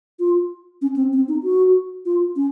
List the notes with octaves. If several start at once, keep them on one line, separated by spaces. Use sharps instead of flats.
F4
C#4
C4
C4
D#4
F#4
F4
C#4